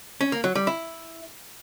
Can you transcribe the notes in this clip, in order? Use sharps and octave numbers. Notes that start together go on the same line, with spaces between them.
C#4
A#3
F#3
G3
E4